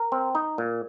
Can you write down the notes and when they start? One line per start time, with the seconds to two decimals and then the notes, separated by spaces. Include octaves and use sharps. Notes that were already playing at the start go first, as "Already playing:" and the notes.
Already playing: A#4
0.12 C4
0.35 D#4
0.58 A#2